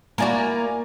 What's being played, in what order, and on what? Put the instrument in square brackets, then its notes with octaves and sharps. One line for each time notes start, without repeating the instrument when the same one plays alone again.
[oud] A#3 E4 F#4 [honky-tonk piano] D5 G#5 A#5